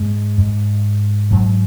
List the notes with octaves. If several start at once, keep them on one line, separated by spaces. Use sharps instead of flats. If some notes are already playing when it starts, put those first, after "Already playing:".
Already playing: G#2 G#3
G#2
G#2 F#3